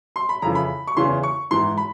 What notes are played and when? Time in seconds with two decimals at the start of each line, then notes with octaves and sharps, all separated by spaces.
0.16 C6
0.29 B5
0.42 F2 C#3 E3 A#5
0.55 B5
0.87 C#6
0.97 E2 C#3 E3 C6
1.23 C#6
1.51 G#2 E3 C6
1.77 B5